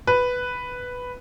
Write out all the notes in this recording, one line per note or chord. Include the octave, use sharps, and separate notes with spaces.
B4